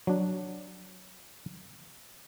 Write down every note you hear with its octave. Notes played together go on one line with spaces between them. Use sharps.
F#3 D4